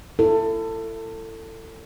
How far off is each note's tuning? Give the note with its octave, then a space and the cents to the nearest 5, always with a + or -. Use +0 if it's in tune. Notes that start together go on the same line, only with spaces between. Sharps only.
E4 +30 A4 +25